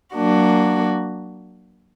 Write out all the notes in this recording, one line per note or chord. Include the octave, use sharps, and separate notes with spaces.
F#3 A#3 D4 F#4